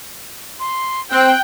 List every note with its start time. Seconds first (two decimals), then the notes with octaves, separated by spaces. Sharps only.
0.59 C6
1.12 C4 G5 F#6